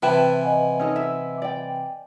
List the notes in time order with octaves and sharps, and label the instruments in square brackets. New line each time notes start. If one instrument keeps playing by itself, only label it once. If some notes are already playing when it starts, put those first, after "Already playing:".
[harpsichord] C3 E3 E4 [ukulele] B4 G5 A5
[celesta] D#5 F#5 G#5
[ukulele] C#4 D#4 A4
E5
D5 G5